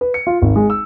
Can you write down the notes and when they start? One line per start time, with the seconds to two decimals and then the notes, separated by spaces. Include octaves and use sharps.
0.01 B4
0.14 C#7
0.27 F4
0.42 G#1
0.56 G#3
0.70 E6